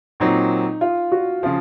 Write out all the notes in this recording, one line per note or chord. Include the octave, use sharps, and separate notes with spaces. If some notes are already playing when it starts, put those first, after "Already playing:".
A#2 F#3 C4 D#4
F4
F#4
C#3 F3 F4